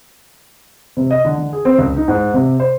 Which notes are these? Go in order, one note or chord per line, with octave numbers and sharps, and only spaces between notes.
C3
D#5
D3
D3
G#4
C4
C#2
D#4
G#2
C3
C5